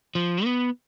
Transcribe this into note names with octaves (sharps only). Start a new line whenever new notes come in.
F3
B3